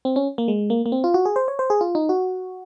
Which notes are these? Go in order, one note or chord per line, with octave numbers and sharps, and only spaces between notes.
C4
C#4
A#3
G#3
A#3
A#3
C4
F4
F#4
G#4
C5
C#5
C5
G#4
F4
D#4
F#4